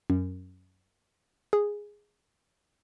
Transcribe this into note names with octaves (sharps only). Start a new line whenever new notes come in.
F#2
G#4